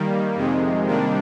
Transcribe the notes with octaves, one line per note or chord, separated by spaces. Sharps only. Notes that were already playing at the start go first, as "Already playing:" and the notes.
Already playing: D#3 G3 A#3
F2 C3 D#3 G#3
C3 D#3 G3 A#3 D4